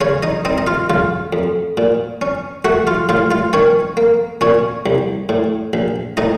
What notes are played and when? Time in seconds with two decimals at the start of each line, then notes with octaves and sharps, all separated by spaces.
0.01 C#3 C#4 C#5
0.23 D#4 D#5
0.45 C4 D#4 D#5
0.58 D#5
0.67 F4 F5
0.90 C#3 F4 F5
1.33 F2
1.77 A#2
2.22 C#4
2.65 A3 F#4 F#5
2.87 F4 F5
3.09 A2 F4 F5
3.31 F4 F5
3.53 D#3 C#4 C#5
3.97 A#3
4.41 A#2 C#4 C#5
4.86 C2
5.29 A2
5.73 A#1
6.17 A2 D#4 D#5